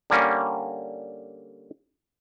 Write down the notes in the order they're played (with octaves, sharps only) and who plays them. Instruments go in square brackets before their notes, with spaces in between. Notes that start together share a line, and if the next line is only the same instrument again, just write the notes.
[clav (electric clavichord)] D3 G3 A#3 C#4